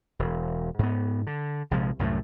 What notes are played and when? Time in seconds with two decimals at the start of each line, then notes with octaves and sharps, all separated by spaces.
0.19 E1
0.79 G#2 B3
1.27 D3
1.71 A#1 C3 F3 G#3
1.99 C2 F#2 A2 A3